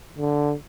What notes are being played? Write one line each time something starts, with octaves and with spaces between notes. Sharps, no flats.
D3